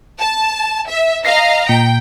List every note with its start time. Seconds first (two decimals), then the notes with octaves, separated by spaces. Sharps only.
0.19 A5
0.89 E5
1.25 D#5 F5 A#5 A#6 C7
1.69 A#2 G5